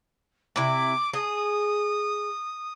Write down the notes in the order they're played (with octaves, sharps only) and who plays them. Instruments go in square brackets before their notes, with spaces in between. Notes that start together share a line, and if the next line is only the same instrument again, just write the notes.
[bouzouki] C3 E4 [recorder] D6
[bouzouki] G#4 [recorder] D#6